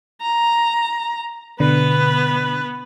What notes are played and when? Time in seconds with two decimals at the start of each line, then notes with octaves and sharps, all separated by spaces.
0.22 A#5
1.60 B2 D3 B3 B4